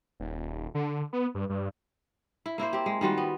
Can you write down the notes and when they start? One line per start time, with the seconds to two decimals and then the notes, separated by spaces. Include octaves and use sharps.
0.20 D#1
0.75 D3
1.13 B3
1.35 G2
1.49 G2
2.46 E4
2.58 A#3 E4 A#4 C5
2.73 C4 G4
2.86 G#3
3.01 D#3 G3 F4 F#4
3.18 B3